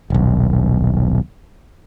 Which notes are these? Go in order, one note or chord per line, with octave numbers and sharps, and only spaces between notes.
D#1 B1